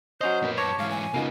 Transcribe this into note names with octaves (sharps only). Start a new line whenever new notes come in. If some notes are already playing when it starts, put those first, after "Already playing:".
F#3 C#4 C5 D#5 G6
F#2 A#2 B4
C#5 A5 D6 A#6 C#7
G#2 E3 F5
G#5
C#3 A#3 B3 D#4 F4